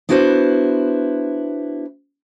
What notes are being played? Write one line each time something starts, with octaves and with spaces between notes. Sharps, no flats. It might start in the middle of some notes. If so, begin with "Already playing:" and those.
B3 D4 E4 F#4 B4 C5